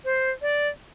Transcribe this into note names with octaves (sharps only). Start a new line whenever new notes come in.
C5
D5